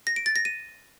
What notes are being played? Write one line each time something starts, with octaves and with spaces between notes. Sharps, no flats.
A#6
D7
A6
A#6
D#7